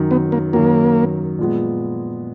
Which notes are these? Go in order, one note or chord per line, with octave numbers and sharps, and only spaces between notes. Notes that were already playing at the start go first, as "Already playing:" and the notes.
Already playing: F#2 D#3 F#3
B3
A#3
F#2 D#3 F#3 A#3
A#2 F3 G#3 B3